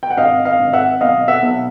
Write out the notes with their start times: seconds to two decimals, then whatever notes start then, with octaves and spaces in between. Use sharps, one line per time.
0.03 G5
0.10 F#5
0.17 G#1 D#5 F5
0.45 D#5 F5
0.60 G#1
0.73 E5 F#5
1.01 B1 D#5 F5
1.28 E5 F#5
1.42 B1